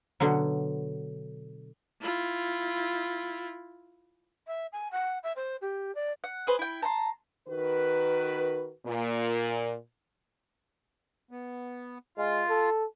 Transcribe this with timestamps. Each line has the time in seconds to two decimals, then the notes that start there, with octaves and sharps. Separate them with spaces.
0.20 B2 D3 F#3
2.02 E4 F4
4.47 E5
4.72 G#5
4.91 F#5
5.23 E5
5.36 C5
5.61 G4
5.95 D5
6.24 F#5
6.47 G#4 B4 C5
6.59 E4 G5
6.82 A5 A#5 C6
7.48 D#3 F#4 A#4 B4
8.85 A#2
11.31 B3
12.17 G#3 F4
12.49 A4